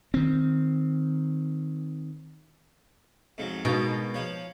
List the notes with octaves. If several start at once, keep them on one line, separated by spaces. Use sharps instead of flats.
D#3 C4
F2 G#2 F#3
G#2 B2 A#3 D#4 G5
F3 C#5